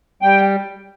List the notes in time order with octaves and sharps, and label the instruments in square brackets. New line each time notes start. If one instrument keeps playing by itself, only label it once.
[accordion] G3 G5